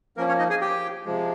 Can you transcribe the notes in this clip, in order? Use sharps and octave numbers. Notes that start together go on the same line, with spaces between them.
F3 A#3 C#4 A#4
C#4 C#5
D#4 D#5
G#4 G#5
G4 G5
C3 F3 G#3